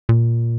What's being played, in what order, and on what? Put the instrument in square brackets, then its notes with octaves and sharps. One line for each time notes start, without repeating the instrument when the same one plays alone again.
[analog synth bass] A#2